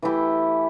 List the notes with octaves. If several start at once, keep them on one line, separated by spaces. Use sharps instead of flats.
E3 A3 E4 G4